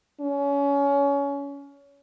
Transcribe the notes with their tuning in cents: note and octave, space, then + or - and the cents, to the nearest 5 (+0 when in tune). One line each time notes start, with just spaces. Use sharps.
C#4 +25